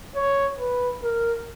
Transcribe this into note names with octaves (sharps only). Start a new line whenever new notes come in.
C#5
B4
A#4